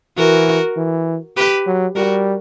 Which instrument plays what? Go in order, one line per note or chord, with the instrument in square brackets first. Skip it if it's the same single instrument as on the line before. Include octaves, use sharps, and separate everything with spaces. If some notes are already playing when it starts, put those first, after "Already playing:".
[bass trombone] E3 [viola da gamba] F#4 A#4
[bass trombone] E3
[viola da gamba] G4 B4
[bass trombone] F#3
[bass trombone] G3 [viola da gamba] F#4 A#4